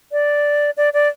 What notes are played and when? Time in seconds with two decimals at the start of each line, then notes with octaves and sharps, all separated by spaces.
0.12 D5
0.77 D5
0.94 D5